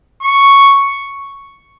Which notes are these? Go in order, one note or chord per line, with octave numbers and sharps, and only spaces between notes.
C#6